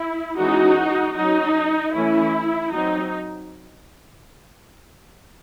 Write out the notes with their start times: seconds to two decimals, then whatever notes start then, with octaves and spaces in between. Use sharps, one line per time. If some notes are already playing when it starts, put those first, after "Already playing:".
Already playing: E4
0.39 E3 G#3 C#4 D#4 F#4
1.16 F#3 C#4 D#4
1.94 E3 A3 C#4 E4
2.72 F#3 C4 D#4